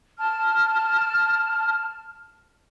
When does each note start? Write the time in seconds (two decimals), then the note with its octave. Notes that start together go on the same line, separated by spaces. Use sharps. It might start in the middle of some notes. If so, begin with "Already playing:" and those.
0.18 A5 F6